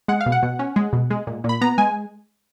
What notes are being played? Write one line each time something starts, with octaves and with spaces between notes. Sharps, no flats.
G#3 F#5
F5
B2
F#5
B2
C#4
G#3
B2
G#3
A#2
A#2
B5
B3 A#5
G#3 G#5